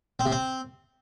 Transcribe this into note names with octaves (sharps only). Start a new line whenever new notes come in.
C4
C3
C4